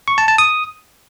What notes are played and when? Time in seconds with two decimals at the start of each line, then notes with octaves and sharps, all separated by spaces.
0.08 C#6
0.18 A5
0.28 A5
0.38 D#6